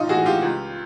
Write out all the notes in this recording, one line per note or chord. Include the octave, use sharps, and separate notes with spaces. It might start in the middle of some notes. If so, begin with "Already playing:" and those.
Already playing: A1 D#4 F4
A2 E3 F#4 G#4
F4 G4
C#2